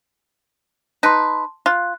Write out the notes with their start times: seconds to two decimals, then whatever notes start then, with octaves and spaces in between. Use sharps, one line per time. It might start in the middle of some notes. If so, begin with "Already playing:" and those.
1.03 D#4 B4 A5 C6
1.66 F4 F#6